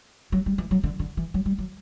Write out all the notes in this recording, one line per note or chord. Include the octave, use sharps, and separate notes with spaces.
F#3
G3
E3
F#3
D3
D3
E3
F#3
G3
F#3